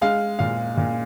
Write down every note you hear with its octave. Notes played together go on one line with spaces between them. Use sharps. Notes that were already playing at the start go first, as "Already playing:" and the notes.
G#3 F5
A#2 F5
A#2